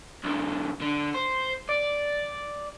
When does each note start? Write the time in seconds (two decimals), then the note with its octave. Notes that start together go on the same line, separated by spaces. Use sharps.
0.24 B1 D3
0.81 D3
1.14 C5
1.69 D5